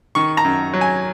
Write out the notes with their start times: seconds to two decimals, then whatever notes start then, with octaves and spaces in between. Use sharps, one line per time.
0.15 D#3 C#6
0.37 A#5
0.45 F#2
0.74 F#3
0.81 G#5